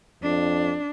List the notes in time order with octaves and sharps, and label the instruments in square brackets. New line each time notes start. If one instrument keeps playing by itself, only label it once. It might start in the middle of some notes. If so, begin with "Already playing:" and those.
[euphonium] F2 [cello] D4